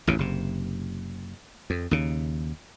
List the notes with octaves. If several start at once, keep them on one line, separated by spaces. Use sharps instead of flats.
A1 E2 C#3
F#1 C3
F2
D#2 C#3